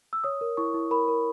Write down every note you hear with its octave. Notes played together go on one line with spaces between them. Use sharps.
E6
C#5 D#6
A#4
E4 C#6
E4
A#4 B5
A#4